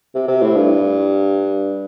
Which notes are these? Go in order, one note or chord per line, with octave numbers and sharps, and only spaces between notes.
C3
C3
A2
G2